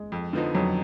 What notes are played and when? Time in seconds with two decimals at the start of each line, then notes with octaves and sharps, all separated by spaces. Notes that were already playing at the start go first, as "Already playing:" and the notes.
Already playing: G#3
0.12 F2
0.33 D3 F3 B3 D#4
0.55 F2 F#3